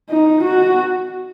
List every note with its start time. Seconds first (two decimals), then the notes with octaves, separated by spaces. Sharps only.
0.10 D#4
0.44 F#4